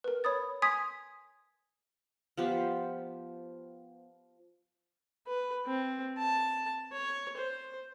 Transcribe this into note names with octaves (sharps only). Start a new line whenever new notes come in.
A#4 B4
C#5 B5 D#6 A6
G#5 C6 D#6 G#6 B6
F3 B3 G4 C5
B4
C4
A5
C#5
C5